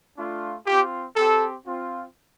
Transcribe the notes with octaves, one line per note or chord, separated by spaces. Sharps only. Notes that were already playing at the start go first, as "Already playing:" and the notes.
A3 D4 F4
C4 F4 G4
C4 G4 A4
C4 F4